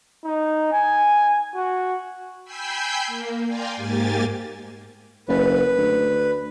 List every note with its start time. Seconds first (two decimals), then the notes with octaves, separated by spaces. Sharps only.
0.25 D#4
0.72 G#5
1.55 F#4
2.44 G5 G#5 B5 E6 G6 C7
3.07 A#3
3.46 D5 F5 G5 G#5 A#5 C6
3.76 G#2 A#3 G4 G#5 A6
5.29 F#1 B4
5.78 D2